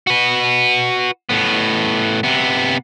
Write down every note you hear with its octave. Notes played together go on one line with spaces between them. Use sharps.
F#4 B4
A2 B3
C3 B3